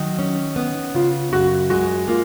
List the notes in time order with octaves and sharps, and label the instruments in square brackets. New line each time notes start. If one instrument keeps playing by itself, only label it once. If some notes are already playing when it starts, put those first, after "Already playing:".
Already playing: [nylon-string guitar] D#3 F#3
C#4
B3
[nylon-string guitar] C#3 [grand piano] F4
[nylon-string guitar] F#2 [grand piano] F#4
[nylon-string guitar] G#3 [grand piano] F#4
[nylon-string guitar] A#3 [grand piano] F4